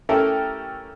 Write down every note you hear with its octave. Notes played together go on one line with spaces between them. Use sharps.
A3 C#4 E4 G4 A4 A#4